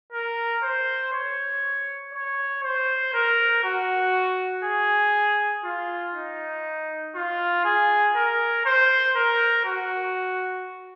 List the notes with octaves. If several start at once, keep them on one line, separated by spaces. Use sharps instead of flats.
A#4
C5
C#5
C#5
C5
A#4
F#4
G#4
F4
D#4
F4
G#4
A#4
C5
A#4
F#4